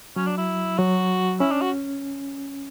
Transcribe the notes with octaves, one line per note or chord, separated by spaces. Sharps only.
F#3 C#4
D4
E4
F#3 F#4
C#4 E4
D4
F#4